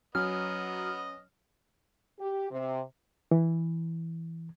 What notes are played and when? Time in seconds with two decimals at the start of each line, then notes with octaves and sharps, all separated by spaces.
0.15 F#3 B3 C#4 D#5 F6
2.20 G4
2.51 C3
3.31 E3